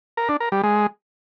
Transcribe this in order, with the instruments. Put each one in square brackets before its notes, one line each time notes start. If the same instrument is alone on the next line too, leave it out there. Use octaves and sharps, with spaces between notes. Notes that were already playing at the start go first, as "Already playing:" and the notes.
[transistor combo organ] A#4
D4
A#4
G3
G#3